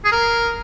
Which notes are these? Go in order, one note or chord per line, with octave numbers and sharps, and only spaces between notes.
G#4
A#4